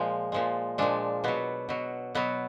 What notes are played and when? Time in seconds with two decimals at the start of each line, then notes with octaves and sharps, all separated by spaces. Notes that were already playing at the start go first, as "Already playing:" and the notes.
Already playing: A#2 F3 G#3
0.32 A#2 F3 G#3
0.78 A#2 F3 G#3 D4
1.24 B2 F#3 B3
1.69 B2 F#3
2.15 B2 F#3 B3